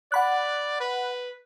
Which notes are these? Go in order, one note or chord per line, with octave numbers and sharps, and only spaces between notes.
D5 F#5 B5 F#6
B4